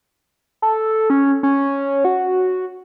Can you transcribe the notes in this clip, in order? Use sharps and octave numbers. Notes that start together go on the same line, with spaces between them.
A4
C#4
C#4
F#4